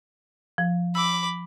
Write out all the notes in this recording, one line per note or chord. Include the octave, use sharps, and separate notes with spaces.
F3
B5 D6 E6